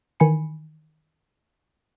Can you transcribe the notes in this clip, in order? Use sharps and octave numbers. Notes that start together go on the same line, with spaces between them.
D#3 E3 G#5 B5 C#7